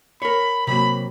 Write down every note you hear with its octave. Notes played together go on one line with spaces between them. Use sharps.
A#4 C#5 B5
C3 F#3 A#3 B5